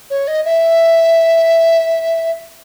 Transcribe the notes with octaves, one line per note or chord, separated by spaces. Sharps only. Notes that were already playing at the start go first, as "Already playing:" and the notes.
C#5
D#5
E5